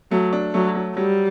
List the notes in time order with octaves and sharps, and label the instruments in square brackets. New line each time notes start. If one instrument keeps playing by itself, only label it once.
[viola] F#3 [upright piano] A3
[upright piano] D4
[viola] F#3 [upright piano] A3
[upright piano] F#3
[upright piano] F#3 [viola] G3